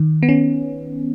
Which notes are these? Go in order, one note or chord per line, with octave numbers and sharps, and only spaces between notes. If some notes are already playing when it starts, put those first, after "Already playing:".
Already playing: D#3
B3
C#4